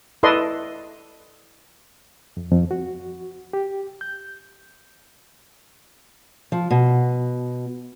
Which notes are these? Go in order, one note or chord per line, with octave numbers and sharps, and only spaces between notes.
E4 A4 B4 D5 D#5 C6
F2
F2
F#4
G4
G6
F3
B2